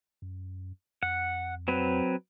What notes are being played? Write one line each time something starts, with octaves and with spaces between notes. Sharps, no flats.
F#2
F2 F#5
F#3 C4 B4